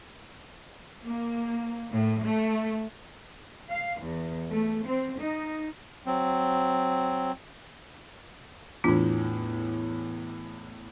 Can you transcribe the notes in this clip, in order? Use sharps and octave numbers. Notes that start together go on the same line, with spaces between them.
A#3
A2
A3
F5
E2
A3
C4
D#4
F#3 C4
E2 A2 D4 F4